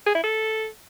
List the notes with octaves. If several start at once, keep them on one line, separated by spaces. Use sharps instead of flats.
G#4
E4
A4